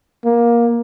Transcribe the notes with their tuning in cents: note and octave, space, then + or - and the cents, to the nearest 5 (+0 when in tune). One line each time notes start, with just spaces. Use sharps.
A#3 +15